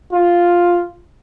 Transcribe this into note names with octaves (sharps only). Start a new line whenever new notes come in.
F4